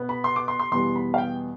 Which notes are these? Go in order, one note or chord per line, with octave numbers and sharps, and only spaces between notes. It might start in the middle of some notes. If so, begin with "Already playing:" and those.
Already playing: B2 B3
B5
C6
D6
C6
C6
E2 B2 G3 B3 C6
B5
F5
G5